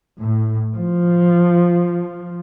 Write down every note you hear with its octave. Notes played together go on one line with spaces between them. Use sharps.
A2
F3